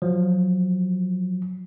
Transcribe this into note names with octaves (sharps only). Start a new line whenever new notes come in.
F3 F#3